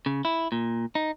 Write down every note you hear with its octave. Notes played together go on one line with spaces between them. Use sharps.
C#3
E4
A#2
D#4